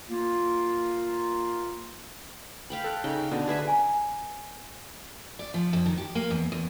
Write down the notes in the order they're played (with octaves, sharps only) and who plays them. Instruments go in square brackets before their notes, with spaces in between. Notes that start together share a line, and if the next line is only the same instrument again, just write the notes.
[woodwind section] A#3 F4
[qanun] F5 G5 B5
[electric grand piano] A4 F#6
[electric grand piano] C#3 D#4 [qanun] G5
[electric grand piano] B2 [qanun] D3
[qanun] G#4 B4 E5
[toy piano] G#5 A#5
[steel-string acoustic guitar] D5
F3
F2
D#3
G4
A#3
E2
E2